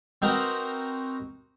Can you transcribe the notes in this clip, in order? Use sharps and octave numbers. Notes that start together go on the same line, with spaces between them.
C4 D#4 F#4 A#4 B4